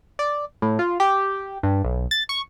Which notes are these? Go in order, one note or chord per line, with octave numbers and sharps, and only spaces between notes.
D5
A2
F4
G4
G2
B1
A6
C#6